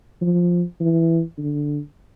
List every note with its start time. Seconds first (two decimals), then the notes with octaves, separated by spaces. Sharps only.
0.21 F3
0.80 E3
1.38 D3